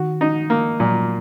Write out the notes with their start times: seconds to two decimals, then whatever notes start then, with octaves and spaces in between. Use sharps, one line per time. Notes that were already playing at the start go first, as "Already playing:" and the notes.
Already playing: D#3 F#4
0.21 D#4
0.50 A#3
0.80 A#2 F#3